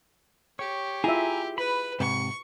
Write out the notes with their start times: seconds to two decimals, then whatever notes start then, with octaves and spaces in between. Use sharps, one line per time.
0.59 G4 C#5
1.04 E4 F4 G#4 E5 G#5 A#5
1.58 B4 B5
2.00 G#2 C3 C#6